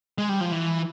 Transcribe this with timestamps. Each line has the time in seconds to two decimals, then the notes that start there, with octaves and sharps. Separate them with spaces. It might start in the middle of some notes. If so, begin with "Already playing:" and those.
0.18 G#3
0.29 G3
0.41 F3
0.51 E3